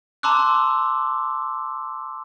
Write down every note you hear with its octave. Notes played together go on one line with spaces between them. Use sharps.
A5 A#5 C6 D6 E6 F#6